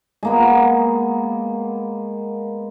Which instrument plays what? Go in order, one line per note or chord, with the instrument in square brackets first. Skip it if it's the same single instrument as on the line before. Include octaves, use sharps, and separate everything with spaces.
[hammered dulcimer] G#3 A#3 B3